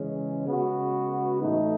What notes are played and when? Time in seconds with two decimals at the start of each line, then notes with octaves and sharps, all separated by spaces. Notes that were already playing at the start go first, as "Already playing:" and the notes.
Already playing: C#3 E3 G#3 C#4
0.47 C#3 G#3 B3 F#4
1.40 A2 E3 A3 D#4